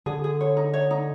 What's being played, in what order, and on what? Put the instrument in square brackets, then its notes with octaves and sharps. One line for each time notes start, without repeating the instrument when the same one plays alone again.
[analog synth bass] D3 [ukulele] G#4
[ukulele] G#4
C#5
D#4
C#5
D#4